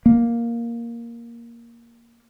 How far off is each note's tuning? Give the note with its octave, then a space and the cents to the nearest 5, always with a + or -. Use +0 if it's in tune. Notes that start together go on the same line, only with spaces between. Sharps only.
A#3 +5